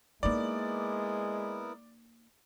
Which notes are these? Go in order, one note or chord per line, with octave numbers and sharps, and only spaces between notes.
G#3 A#3 B3 D#4 E4 A#4 D5